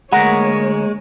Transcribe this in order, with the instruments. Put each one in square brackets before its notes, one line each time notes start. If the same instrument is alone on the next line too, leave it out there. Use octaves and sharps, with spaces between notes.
[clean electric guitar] D2 A#4 [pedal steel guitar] G#3 [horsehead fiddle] A#3 C#5 [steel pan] F#5